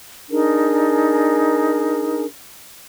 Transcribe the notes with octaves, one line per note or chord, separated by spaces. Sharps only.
D4 D#4 G#4 A#4